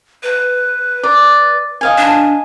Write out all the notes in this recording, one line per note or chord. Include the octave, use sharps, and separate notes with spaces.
B4
D5
D#5 F5 G#5
D4